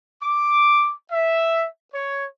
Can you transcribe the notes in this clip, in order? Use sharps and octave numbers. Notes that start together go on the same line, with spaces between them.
D6
E5
C#5